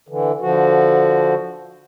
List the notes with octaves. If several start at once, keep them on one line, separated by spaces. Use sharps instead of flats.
D3 E3
D3 F3 F#4